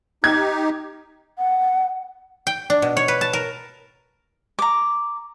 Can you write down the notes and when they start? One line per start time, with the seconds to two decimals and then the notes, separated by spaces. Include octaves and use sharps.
0.24 D#4 G4 G#6
1.38 F#5
2.47 G5
2.70 D4
2.82 B2
2.97 C#5
3.08 B4
3.21 A5
3.33 A#4
4.59 A#5 D6